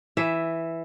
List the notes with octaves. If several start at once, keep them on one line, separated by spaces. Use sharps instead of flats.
E3 E5